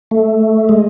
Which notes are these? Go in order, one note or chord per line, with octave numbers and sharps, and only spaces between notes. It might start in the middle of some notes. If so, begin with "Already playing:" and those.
A3
G#3